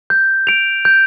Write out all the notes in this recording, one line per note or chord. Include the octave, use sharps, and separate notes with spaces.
G6
D7 F7
G6